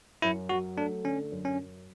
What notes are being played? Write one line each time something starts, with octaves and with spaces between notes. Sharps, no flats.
F#2 E4
F#3 F#4
A3 D4
D3 C#4
F#2
C#4
F#3